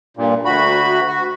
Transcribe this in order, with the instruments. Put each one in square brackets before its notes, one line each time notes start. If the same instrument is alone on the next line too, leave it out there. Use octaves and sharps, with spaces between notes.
[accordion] G2 A#2
D2 F#4 B5
F#4